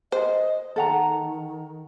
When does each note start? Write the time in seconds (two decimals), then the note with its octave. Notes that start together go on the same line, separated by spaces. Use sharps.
0.12 C5 D#5
0.76 D#3 A4 F#5 A#5